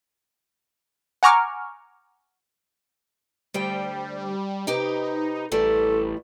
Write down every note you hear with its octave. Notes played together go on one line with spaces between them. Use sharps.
F#5 G#5 A#5 C#6 D6 F6
D2 G3 C5 G5
C3 D#4 G4 B4
A1 E3 G3 A3 A4